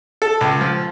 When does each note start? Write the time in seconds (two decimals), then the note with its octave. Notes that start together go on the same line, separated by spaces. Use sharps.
0.22 A4
0.41 C#2
0.61 F3